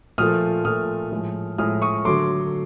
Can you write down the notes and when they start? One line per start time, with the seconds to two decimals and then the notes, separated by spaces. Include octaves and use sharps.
0.18 A#2 F3 A3 D#6 F6
0.65 A#2 F3 A3 D#6 F6
1.12 A2 F3 G#3
1.58 A2 F3 G#3 D#6 F6
1.82 C#6 D#6
2.05 D3 F#3 A3 C6 D6